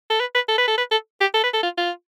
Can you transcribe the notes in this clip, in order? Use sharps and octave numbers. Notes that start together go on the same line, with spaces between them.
A4
B4
B4
A4
B4
A4
B4
A4
G4
A4
B4
A4
F4
F4